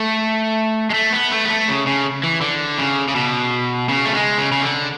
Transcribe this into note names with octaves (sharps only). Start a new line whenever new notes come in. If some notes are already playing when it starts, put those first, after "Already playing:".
Already playing: A3
G#3
A3
B3
A3
B3
A3
C#3
C#3
E3
D3
C#3
C#3
B2
C#3
A3
G#3
C#3
C#3
D3